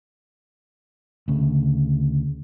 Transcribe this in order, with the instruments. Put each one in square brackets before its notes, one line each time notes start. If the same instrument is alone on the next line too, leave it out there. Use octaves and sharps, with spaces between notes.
[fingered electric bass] D2 C#3